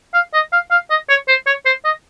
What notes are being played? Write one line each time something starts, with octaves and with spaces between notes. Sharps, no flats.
F5
D#5
F5
F5
D#5
C#5
C5
C#5
C5
D#5